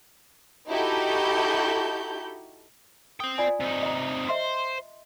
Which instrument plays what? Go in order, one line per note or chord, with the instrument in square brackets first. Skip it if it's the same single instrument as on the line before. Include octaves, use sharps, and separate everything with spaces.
[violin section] D#4 E4 F#4 G4 A4 G6
[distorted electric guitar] C5 G5 [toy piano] D#6
[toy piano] F4 D5 G#5
[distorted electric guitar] C3 D#4
[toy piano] D#5 A#5
[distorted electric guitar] C5 [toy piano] D#5 E5 C6